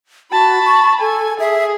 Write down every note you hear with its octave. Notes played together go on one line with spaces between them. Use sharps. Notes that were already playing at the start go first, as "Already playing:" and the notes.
F#4 A5 B5
C#6
A4 G#5
G#4 E5